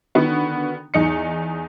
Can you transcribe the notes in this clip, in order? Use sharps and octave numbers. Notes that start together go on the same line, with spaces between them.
D3 D#3 B3 F#4
E2 D#4 C#7